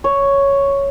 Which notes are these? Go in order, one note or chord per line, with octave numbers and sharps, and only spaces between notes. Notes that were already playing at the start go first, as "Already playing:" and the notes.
C#5